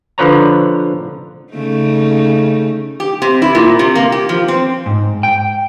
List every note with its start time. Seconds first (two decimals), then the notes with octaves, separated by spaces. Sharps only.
0.18 D3 F3 B4 C#5 A#5
1.53 C#3 A3 D#4
3.00 G4
3.22 C3
3.42 E4
3.55 A#2
3.79 C3
3.95 A#3
4.12 G4
4.29 F3
4.48 C4
4.86 G#2
5.23 G5